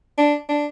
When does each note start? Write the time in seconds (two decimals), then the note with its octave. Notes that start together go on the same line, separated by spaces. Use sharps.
0.18 D4
0.49 D4